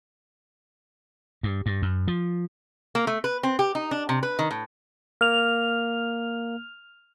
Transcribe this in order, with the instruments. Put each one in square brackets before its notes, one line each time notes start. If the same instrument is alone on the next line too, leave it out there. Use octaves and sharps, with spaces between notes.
[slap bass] G2
G2
F#2
F3
[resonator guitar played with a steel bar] A#3
A3
B4
C4
G4
D#4
D4
C3
B4
D#3
A2
[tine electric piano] A#3 [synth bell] F6 F7